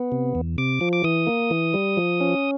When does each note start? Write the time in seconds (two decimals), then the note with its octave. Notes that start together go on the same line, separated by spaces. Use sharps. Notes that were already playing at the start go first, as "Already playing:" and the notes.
Already playing: B3
0.12 C3
0.35 E2
0.58 C3 D6
0.81 F3
0.93 D6
1.04 E3 D#6
1.27 A#3
1.51 E3
1.74 G3
1.97 F3
2.20 C#4